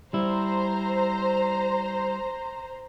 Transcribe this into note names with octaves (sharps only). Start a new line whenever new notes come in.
G3 E4 C5 A#5